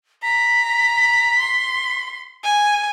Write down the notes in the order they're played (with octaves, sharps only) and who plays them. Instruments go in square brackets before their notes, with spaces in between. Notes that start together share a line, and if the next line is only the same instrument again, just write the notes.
[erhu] A#5 [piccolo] B6
[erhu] C6
G#5